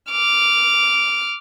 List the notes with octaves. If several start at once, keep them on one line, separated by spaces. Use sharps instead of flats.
D6 F6